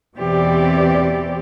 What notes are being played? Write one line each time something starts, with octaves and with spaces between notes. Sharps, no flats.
E2 B2 E3 C4 G4 D5